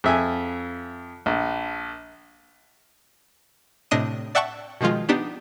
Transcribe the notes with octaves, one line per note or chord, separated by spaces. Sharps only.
F2 E5 G#5
A#1
A2 C3 D4 D#5 D#6 D#7
D5 E5 F#5 G5 A5 C#6
B2 D#3 F3 G#3 F4
B3 D4 D#4 G4